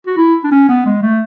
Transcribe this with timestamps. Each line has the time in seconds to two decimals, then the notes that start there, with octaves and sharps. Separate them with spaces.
0.07 F#4
0.17 E4
0.44 D4
0.52 C#4
0.69 B3
0.85 G#3
1.02 A3